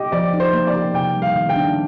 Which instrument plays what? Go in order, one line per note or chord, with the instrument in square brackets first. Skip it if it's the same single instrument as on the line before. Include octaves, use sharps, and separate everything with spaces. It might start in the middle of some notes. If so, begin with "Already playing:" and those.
Already playing: [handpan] G4 [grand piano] D#5
[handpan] F3 [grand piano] D5
[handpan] D#4
[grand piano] C5
[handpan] A#3
[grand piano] D5
[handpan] G4
[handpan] C3 [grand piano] G5
[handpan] G3
[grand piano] F5
[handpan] D#3
[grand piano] G5
[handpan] D4